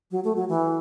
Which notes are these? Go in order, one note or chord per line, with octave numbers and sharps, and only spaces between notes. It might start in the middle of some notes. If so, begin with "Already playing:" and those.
F#3
A3
F#3
E3